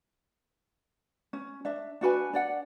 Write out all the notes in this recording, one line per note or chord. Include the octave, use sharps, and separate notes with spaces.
C#4
D4 E5
D4 F#4 B4 G#5
D4 D5 F#5